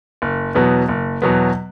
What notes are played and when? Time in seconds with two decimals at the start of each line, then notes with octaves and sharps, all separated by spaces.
0.22 F#1
0.55 E2 B2 F#3 B3
0.89 F#1
1.22 E2 B2 F#3 B3